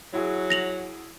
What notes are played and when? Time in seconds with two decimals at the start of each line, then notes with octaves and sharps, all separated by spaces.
0.14 F#3 E4 F#4 G#4
0.50 A#6 F7 F#7